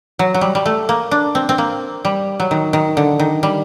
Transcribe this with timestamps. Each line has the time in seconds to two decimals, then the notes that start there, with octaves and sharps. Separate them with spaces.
0.19 F#3
0.34 F#3
0.41 G3
0.55 G3
0.66 A3
0.89 A#3
1.11 D4
1.35 C4
1.49 C4
1.58 A#3
2.05 G3
2.40 F#3
2.51 D#3
2.73 D#3
2.97 D3
3.19 D#3
3.43 G3